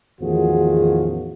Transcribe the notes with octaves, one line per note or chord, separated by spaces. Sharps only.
A1 E2 D#3 F3 F#4 G#4